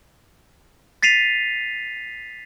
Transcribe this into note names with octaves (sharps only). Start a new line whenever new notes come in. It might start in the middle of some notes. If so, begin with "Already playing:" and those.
A6 B6 C7 D#7 F7